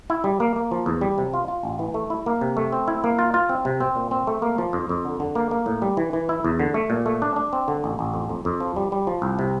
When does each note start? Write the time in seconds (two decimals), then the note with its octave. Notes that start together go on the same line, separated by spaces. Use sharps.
0.10 E4
0.24 G3
0.40 A#3
0.56 A#3
0.72 F3
0.86 E2
1.01 G3
1.18 C3
1.34 F4
1.48 F4
1.63 A1
1.79 E3
1.94 A3
2.10 E4
2.26 A#3
2.41 C3
2.57 A3
2.72 C4
2.88 E4
3.04 A#3
3.19 F4
3.34 F4
3.49 C4
3.65 C3
3.80 C4
3.96 A#2
4.11 C4
4.27 A3
4.42 A#3
4.58 F3
4.73 F2
4.89 F2
5.05 D3
5.20 D3
5.35 A#3
5.51 A#3
5.66 A2
5.82 G3
5.97 E3
6.13 E3
6.29 E4
6.44 E2
6.60 D3
6.74 A3
6.90 A#2
7.06 A3
7.22 D4
7.36 D4
7.53 C4
7.68 D3
7.84 A1
7.99 A1
8.14 F2
8.29 F2
8.45 F2
8.60 F3
8.76 G3
8.92 G3
9.07 F3
9.22 C2
9.39 C3